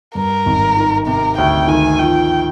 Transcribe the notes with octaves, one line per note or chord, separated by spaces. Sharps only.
G2 A#4
G#1
D#3
C3 A#4
D2 G5
D#3 G#5
F3 G5